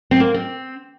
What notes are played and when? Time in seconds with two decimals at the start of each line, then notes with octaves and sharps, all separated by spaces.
0.11 C4
0.20 A#3
0.34 C4